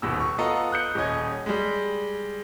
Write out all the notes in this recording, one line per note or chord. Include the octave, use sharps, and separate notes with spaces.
D#1 D#2 B2 E6
C#6
B3 F4 A4 D#5 A#5
D#6 F#6 G6 C#7
D#1 C#4 D#5 G#6
G3 G#3